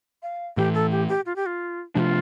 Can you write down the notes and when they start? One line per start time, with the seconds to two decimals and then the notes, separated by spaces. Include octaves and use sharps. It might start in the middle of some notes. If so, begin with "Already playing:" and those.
0.23 F5
0.57 A2 E3 A3 G4
0.74 A4
0.91 G4
1.09 G4
1.26 F4
1.36 G4
1.46 F4
1.95 C3 F3 A3 D4 F4 G4